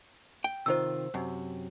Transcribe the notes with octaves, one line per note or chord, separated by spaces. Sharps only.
G5
C3 D#3 F4 C5 E6
F#2 C3